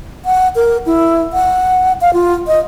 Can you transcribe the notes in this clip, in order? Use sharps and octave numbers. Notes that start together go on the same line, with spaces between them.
F#5
A#4
E4
F#5
F5
F4
D#5